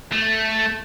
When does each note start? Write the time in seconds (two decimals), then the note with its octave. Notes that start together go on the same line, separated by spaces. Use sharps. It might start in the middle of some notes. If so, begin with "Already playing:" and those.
0.12 A3